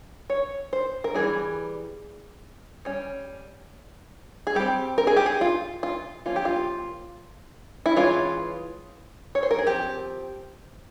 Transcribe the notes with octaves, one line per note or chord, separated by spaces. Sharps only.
C#5
C5
A#4
E3 G3 A#3 C#4 G#4
G3 C#4
G#4
G3 C4 G4
A#4
G#4
G4
G#4
F4
F4
F3 A#3 C#4 F4
G4
F4
E4
E3 G#3 C#4 F4
C#5
C5
A#4
G#4
F3 C4 G4